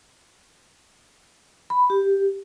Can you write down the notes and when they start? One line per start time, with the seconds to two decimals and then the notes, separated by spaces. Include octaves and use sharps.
1.70 B5
1.90 G4